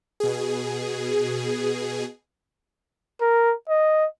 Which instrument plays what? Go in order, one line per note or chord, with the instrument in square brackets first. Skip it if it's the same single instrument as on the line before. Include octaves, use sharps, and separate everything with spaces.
[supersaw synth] B2 G#4
[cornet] A#4
D#5